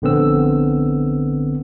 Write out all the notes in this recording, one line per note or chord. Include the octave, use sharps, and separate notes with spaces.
A#1 D3 B3 C4 E6